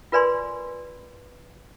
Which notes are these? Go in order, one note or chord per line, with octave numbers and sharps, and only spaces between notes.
F4 A#4 B4 D5 G#5 C6